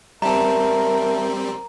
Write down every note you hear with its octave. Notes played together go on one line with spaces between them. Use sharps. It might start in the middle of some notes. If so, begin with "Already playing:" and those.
G3 C4 A#4 E5 A5 A#5